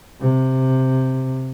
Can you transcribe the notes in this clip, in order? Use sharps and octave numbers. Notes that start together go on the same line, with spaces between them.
C3